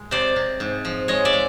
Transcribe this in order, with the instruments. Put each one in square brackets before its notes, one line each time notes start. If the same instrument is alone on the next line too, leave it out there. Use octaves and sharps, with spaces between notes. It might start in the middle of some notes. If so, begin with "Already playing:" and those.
Already playing: [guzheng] G#3
C3 C5 D5
C3
G#2
F3
G#3 C#5 D#5
D5 E5
G#3